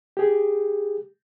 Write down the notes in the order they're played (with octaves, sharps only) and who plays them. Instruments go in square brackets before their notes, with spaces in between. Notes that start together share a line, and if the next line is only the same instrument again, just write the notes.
[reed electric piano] G4 G#4